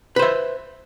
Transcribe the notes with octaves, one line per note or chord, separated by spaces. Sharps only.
B4 C5 E5